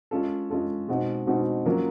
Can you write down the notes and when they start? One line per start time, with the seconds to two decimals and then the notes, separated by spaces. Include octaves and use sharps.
0.11 G#3 C#4 F4 A4
0.50 G#3 C#4 F4 A4
0.88 B2 G#3 C4 D#4 F#4
1.27 B2 G#3 C4 D#4 F#4
1.65 F#3 A#3 C#4 F4 A#4